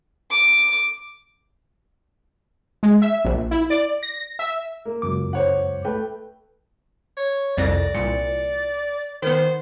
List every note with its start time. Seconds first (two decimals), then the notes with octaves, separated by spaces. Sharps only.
0.31 D6
2.83 G#3
3.02 E5
3.25 A#1
3.51 E4
3.70 D5
4.03 A#6
4.39 E5
4.85 A#3
5.02 C#2 F#2 D6
5.33 C5 C#5 F#5
5.85 A3 B4 G5
7.17 C#5
7.57 C2 F2 D5 A#6
7.94 C2 A#2 C#7
9.22 D#3 B3 C5